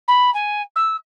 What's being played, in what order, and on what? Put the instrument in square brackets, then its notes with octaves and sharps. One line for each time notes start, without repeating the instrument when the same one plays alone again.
[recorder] B5
G#5
E6